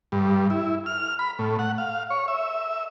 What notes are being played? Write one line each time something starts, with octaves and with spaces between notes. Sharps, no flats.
G2
E4
F6
B5
A2
F#5
F5
C#5
E5